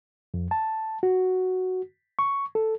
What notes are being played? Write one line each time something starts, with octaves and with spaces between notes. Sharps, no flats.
F2
A5
F#4
C#6
A4